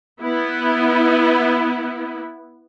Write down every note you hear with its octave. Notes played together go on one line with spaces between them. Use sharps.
B3 E4